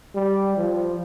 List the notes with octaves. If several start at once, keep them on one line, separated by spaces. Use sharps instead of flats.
G3
F3